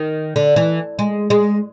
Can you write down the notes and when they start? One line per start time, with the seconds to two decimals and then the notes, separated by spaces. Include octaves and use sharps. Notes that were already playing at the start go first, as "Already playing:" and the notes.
Already playing: D#3
0.36 D3
0.56 E3
0.99 G#3
1.30 G#3